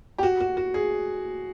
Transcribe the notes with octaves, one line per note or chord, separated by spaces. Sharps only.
G4
F#4
F#4
F#4
G#4